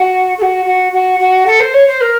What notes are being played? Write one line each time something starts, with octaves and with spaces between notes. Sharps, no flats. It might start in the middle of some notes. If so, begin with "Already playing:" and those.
Already playing: F#4
A4
F#4
F#4
F#4
F#4
A4
C5
C#5
C5
A#4